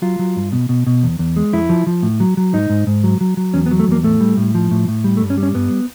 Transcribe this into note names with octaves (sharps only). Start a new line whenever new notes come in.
F#3 F4
F#3
G2
B2
B2
B2
E2
E2
G#3
F2 E4
F3
F3
A2
F#3
F#3
G#2 D#4
G#2
G#2
F#3
F#3
F#3
E2 C#4
B3
F#3
A3
E2 A#3
A2 A3
G3
A2
F3
A2
A2
G3
A3
G2
C#4
G3
C#4
G2 B3